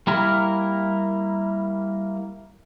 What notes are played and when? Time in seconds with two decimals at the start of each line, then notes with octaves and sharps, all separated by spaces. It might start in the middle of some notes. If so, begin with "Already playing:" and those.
0.07 G3 A#3 E4 A#4